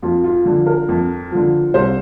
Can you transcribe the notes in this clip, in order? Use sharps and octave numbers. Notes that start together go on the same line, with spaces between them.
F2 F4
F4
D3 F3
A#4
F2
D3 F3
C2 C5